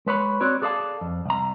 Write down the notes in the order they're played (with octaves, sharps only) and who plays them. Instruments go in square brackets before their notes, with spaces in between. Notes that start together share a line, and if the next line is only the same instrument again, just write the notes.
[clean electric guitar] G#3 B4 C#5 B5
C4 F#4 C#5 D5
G#4 A4 D5 D#5 F5 A5
F2
C2 A#5